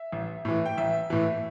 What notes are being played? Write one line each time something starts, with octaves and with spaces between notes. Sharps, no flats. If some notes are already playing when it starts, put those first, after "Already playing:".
Already playing: E5
A1
A2 E3
G5
A1 E5
A2 E3